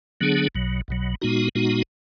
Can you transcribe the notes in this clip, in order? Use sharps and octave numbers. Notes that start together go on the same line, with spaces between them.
D3 F#3 B3 D4 G#4
B1 B2 F#3
B1 B2 F#3
A#2 G#3 B3 D#4 F#4
A#2 G#3 B3 D#4 F#4